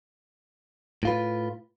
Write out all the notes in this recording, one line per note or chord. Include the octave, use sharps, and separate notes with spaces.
A2 F4 B4